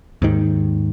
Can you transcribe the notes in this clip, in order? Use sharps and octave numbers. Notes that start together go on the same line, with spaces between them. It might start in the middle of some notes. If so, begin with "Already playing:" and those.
D#2 G#2 D#3